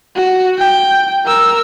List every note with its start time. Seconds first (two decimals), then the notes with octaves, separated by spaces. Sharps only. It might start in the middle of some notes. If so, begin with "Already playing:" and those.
0.16 F#4
0.58 G5
1.25 A#4 E6